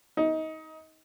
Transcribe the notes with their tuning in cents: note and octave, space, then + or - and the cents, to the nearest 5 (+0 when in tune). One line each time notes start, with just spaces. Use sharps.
D#4 +25